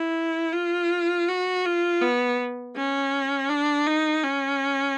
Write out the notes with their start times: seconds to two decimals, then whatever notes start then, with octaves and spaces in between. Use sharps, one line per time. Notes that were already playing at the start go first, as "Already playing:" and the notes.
Already playing: E4
0.53 F4
1.28 F#4
1.65 F4
2.01 B3
2.76 C#4
3.49 D4
3.87 D#4
4.23 C#4